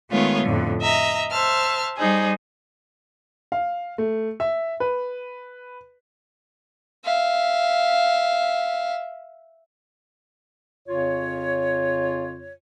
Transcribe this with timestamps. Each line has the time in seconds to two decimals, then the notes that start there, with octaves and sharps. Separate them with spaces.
0.11 D#3 G#3 A3 B3 F4 C#5
0.44 F2 A2 D3
0.81 D#5 E5 A#5
1.31 C5 E5 A5 F6
1.97 G3 D#4 G#4 C5
3.52 F5
3.98 A3
4.40 E5
4.80 B4
7.05 E5 F5
10.87 F2 C#3 F4 C#5